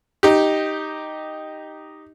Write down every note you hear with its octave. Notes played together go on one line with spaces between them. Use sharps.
D#4 G4